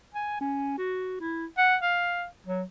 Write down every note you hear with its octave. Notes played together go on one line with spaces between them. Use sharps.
G#5
C#4
F#4
E4
F#5
F5
F#3